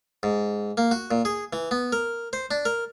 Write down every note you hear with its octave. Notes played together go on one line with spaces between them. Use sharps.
G#2
A#3
F#4
A#2
G#4
E3
B3
A#4
C5
D4
A#4